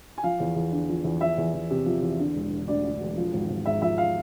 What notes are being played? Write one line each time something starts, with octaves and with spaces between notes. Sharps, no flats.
G#5
F3 F5
E2
E2
D3
F3
E2
F3 E5
E2
E2
C3
F3
E2
D3
E1
E1
D2 D5
D3
E1
F3
G#1
G#1
G#2 E5
F3 E5
F5